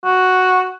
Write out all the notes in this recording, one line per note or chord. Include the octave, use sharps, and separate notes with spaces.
F#4